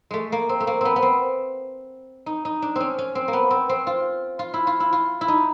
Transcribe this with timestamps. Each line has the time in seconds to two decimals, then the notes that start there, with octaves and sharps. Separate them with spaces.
0.11 G#3 A3
0.32 A#3
0.49 C4
0.60 A3
0.67 A#3
0.81 B3 C4
0.96 B3
1.02 C4
2.26 D#4
2.45 D#4
2.62 D4
2.76 C4 C#4
2.98 C#4
3.15 C4
3.28 A#3
3.33 B3
3.51 C4
3.69 C4
3.87 F4
4.39 F4
4.54 E4
4.67 F4
4.80 E4
4.93 F4
5.21 E4
5.28 D#4